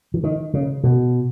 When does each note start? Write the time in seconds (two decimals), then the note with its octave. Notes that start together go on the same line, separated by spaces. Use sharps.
0.14 E3
0.24 D#3
0.54 C#3
0.83 B2